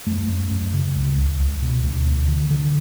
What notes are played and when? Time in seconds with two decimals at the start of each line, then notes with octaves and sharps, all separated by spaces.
0.06 F#2 A3
0.28 F#2
0.51 F#2
0.73 C#3
0.95 C#2
1.18 C#2
1.39 C#2
1.62 B2
1.83 D2
2.05 D2
2.28 D3
2.50 D3